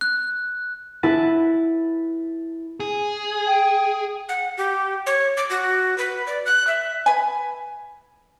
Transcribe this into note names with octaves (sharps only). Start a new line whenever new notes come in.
F#6
E4 B4 A5
G#4
G5
F#5
G4
C#5
D6
F#4
B4
D5
F#6
E5
B4 G#5